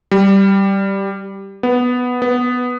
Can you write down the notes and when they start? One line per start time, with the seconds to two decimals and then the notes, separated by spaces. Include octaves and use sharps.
0.11 G3
1.63 B3
2.22 B3